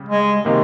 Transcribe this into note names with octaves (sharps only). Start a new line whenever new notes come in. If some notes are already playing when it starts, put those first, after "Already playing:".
Already playing: C#3 G3
G#3
C3 D#3 G#3 A#3